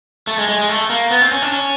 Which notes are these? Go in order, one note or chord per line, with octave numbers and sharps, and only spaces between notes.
A3
G#3
G#3
G#3
A3
A#3
B3
C4
C#4
D4
C#4